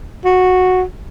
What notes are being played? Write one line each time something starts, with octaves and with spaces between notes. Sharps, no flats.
F#4